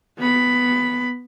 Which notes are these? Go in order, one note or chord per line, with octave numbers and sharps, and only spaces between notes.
B3 B5